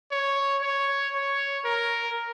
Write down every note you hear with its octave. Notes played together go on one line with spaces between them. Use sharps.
C#5
C#5
C#5
A#4